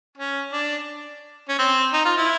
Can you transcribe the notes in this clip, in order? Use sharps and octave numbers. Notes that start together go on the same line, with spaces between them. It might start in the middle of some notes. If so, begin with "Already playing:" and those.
C#4
D4
C#4
C4
D#4
F4
E4